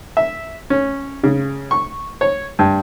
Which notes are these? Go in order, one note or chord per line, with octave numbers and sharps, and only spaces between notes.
E5
C#4
C#3
C#6
C#5
G2